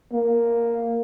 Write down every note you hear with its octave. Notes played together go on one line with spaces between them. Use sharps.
A#3